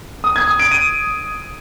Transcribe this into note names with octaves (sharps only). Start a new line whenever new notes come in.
D#6
G#6
D#6
D7
D#7